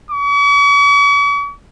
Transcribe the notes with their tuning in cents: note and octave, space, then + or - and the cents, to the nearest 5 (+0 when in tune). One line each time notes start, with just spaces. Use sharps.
C#6 +45